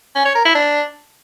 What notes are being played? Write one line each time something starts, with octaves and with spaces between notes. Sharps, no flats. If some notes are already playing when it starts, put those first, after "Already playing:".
C#4
C#5
A#4
E4
D4